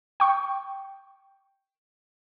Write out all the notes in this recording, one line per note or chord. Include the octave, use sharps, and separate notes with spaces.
G5 C#6